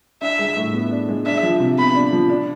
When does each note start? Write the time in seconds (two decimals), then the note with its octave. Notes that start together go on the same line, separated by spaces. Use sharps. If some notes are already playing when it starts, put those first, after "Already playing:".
0.22 D4 E5
0.39 G#3
0.56 A2
0.73 B3
0.91 D4
1.09 G#3
1.26 D4 E5
1.43 F3
1.60 C3
1.78 B3 B5
1.95 D4
2.13 F3
2.30 D4